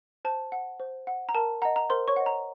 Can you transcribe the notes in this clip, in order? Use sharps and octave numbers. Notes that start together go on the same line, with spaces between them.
C5 A5
F#5
C5
F#5
A#5
A#4 A5
D#5 F#5 A#5
A#5
A#4 C5 C6
C#5 C#6
D#5 F#5
A#5